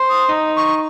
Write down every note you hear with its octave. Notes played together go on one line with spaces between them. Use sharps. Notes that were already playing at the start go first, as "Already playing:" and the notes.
Already playing: C5
D#6
D#4
C#6